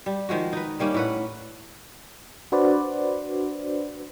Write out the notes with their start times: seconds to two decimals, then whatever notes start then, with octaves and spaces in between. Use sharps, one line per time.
0.06 G3
0.29 D#3 F3 G#3 F#4
0.53 D#4 B4
0.80 G3 A#3 C#4 D#4
0.94 A2 B4 F#5
2.52 D4 F#4 B4 C5 D5